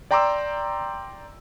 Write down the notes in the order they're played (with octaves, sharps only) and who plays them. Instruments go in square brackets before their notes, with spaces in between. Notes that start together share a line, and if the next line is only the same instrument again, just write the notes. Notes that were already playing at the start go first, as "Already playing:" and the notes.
[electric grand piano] D5 G5 A#5 C6 D6 E6